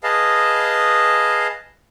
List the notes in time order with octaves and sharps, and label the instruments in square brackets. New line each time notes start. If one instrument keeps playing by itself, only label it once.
[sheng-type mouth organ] G#4 B4 D#5 F5 A5